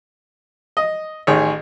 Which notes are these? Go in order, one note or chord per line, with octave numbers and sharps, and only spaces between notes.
D#5
A1 D#3 G#4 C#5